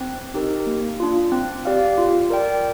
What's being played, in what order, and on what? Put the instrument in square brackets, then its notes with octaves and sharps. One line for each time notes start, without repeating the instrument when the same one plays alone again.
[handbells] C4
D#4 G4 A#4
A#3
D4 F4
C4
G4 D5 F5
F4
A#4 D5 G5